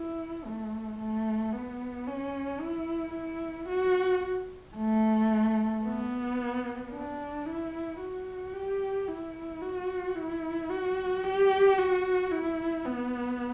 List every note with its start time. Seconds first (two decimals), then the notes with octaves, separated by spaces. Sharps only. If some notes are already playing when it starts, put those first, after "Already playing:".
Already playing: E4
0.45 A3
0.98 A3
1.52 B3
2.07 C#4
2.61 E4
3.14 E4
3.69 F#4
4.77 A3
5.84 B3
6.92 D4
7.46 E4
8.00 F#4
8.54 G4
9.08 E4
9.62 F#4
10.16 E4
10.70 F#4
11.24 G4
11.78 F#4
12.31 E4
12.85 B3